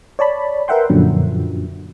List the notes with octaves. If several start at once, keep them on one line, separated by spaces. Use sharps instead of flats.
C#5 D5 A5 B5
A#4 B4 E5 F#5 G5 C6
F#2 A#2 D3 F3 F#3